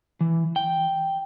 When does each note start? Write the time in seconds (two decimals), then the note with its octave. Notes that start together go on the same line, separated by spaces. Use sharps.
0.21 E3
0.56 G5